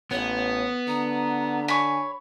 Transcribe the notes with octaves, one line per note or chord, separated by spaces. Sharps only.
A1 B3 C#5
D3 A#5
C#5 G#5 B5